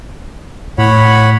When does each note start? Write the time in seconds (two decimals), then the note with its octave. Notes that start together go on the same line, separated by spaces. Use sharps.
0.78 A2 C#5 F#5 B5